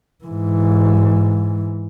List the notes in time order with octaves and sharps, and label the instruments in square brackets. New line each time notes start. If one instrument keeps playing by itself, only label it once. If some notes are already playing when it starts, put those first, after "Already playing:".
[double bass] G#2 E3